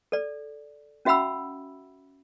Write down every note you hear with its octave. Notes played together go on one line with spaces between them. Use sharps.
A4 D5
C#4 F#4 E5 F#5 B5 E6